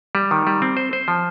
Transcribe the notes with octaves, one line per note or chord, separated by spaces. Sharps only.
G3
D#3
G3
C4
C5
C5
F3